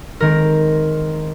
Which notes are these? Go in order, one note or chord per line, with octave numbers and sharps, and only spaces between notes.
D#3 G#3 C4 A#4